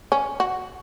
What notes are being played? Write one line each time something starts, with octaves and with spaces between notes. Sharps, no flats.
C#4
F#4